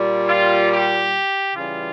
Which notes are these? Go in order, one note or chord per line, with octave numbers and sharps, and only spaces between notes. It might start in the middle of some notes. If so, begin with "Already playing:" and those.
Already playing: A#2 G3
F4
G4
C#3 E3 G3 F4